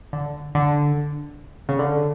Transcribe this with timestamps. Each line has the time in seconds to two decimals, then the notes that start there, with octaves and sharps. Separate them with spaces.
0.13 D3
0.55 D3
1.69 C#3
1.79 D3